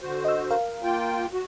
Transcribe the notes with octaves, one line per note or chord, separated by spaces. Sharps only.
D3 F#4 C5
D#5 E6
A#4 F5
A#3 F4 G5
F#4